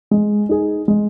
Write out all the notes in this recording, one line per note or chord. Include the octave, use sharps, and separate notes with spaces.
G#3
D#4 G#4
G#3